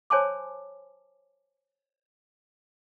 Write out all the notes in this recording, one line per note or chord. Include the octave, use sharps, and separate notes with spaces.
C5 C#5 G#5 A5 C6 D6